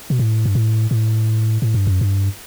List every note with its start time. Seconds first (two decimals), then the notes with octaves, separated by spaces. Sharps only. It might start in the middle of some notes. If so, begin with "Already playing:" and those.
0.10 B2
0.19 A2
0.46 G2
0.55 A2
0.91 A2
1.62 A2
1.74 G2
1.87 F#2
2.01 G2